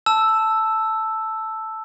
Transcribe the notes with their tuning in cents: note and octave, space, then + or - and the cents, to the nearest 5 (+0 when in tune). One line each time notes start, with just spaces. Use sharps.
A5 +0 E6 +0